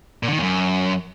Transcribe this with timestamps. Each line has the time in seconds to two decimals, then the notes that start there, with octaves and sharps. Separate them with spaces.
0.23 A#2
0.28 D3
0.33 D#3
0.38 E2
0.43 F#2